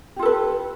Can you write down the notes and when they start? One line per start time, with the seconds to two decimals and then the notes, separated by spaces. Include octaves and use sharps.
0.16 G4
0.19 F4
0.22 A4
0.25 B4